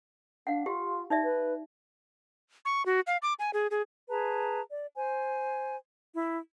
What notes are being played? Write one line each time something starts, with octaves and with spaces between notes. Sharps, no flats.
D4 F5 F#5
F4 G4
D#4 D5 E5
B4
C#6
F#4
F5
D6
G#5
G#4
G#4
G#4 B4 A5 A#5
D5
C5 G#5
E4